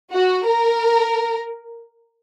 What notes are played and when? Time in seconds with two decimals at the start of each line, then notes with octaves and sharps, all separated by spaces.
0.12 F#4
0.46 A#4